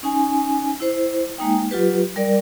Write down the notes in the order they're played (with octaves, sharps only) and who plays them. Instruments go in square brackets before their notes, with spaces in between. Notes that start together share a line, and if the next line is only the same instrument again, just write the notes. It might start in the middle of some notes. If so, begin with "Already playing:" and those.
[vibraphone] C#4 D#4 G#5
E4 C5
G#3 A#3 D#4 G5
F#3 F4 G4 B4
G3 A#4 D5